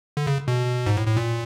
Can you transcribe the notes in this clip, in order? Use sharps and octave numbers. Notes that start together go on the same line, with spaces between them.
D3
C#3
B2
G#2
A2
A2
A#2